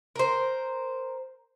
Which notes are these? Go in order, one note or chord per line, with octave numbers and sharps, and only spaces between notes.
A#4 C5